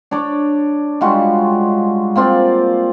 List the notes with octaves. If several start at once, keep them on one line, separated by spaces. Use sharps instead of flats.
D4 C#5 D5
G3 G#3 F4 F#4
A#3 C4 F4 D5